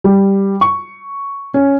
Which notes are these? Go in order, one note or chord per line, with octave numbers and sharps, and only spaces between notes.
G3
C#6
C#4